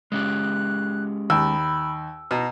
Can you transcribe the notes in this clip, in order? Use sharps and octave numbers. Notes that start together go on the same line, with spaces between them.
G#3 C#4 G4 F#6
D#2 B5 E6
B2 A#5